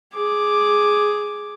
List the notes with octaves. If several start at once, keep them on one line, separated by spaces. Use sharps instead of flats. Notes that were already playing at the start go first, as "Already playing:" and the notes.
G#4 D6